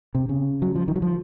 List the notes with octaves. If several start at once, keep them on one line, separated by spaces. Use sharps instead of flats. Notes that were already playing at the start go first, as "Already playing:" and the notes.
C3
C#3
F#3
F3
D#3
F#3
F3